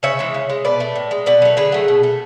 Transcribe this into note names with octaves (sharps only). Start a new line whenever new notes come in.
C#3 C#5 E5
E3 G#3
C#3
G#3
B2 B4 D5
A3
A2
G#3
B2 B4 D5
F#3 A3
D3 G#4 B4
F#3 A3
B2
A3